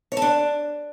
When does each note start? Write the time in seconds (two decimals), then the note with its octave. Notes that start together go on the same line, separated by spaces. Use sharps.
0.12 C#5
0.17 A4
0.22 D4